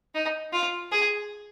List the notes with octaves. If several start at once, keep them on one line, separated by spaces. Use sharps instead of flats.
D#4
F4
G#4